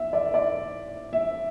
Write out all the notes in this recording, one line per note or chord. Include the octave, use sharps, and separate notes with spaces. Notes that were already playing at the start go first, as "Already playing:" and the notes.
Already playing: E5
D5
D5
E5